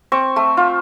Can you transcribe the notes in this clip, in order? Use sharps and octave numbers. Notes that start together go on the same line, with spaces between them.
C4 C#6
A3
F4